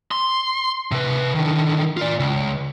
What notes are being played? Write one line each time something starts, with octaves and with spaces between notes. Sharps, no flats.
C6
C3 B4
D3 D#3
F4 D5
C#2